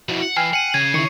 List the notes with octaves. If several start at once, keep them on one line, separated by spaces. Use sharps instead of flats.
F2 B2 E4 F#4
F#5
E3 G5 G#5 F6 C7
F#5 C#7 D#7
C#3 G#6 D#7
D#3 E4 C#6 C#7